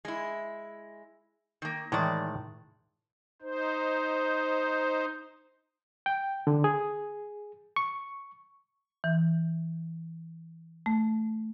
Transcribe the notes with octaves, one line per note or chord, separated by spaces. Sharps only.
G#3 E4
D#3 A#3
A2 D#3 E3 G#3 D5
D#4 C5
G5
D3
G#4
C#6
E3
A3